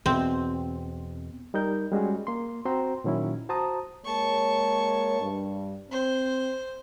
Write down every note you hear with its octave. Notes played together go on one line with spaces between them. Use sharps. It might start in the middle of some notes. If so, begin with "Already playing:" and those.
E2 B2 C4
G3 D#4 A#4 G6
G3 G#3 C#4 F#4 G#4
A#3 C6
C4 F#4 C5 G5 A#5 C6
A#2 D#3 F#3 C#4 E4
F#4 C5 A5 A#5 D#6
G#3 A#3 C#5 A5 C#6
G2
C4 C5